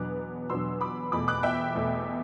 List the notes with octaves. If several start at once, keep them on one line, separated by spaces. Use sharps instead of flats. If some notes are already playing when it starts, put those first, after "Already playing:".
Already playing: E2 B2 F#3 B3 D4 D6 F#6
E2 B2 F#3 B3 D4 C6 E6
B5 D6
E2 B2 A3 B5 D6
D6 F#6
E5 G5
E2 B2 A3